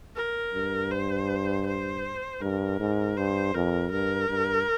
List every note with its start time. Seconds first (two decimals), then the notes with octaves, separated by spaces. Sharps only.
0.16 A#4
0.54 G2
0.91 C5
1.67 C5
2.41 G2 A#4
2.80 G#2
3.17 G2 C5
3.54 F2 A#4
3.92 G2 A#4
4.29 G2